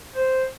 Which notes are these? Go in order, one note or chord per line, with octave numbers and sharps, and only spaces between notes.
C5